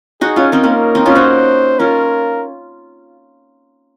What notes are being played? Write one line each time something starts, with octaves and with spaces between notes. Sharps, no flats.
D#4 F#4 G#4
C#4 F4
C4 D#4 A#4
A#3 C#4
C4 D#4
C#4 F4
D#4 F#4 C5
C#4 F4 A#4